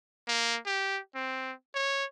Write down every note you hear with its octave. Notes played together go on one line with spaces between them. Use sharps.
A#3
G4
C4
C#5